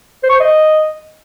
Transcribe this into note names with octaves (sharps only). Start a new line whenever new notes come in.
C5
C#6
C5
D#5